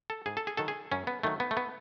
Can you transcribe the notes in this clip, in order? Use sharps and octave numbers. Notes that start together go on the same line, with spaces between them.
A4
G#2 G#4
A4
G#4
D#3 F#3 A4
G#4
F#2 C#4
B3
D#3 F#3 A3
B3
A3
B3